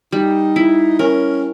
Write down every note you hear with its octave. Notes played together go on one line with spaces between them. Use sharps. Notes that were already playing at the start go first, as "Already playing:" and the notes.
G3 D#4
E4
C#4 A#4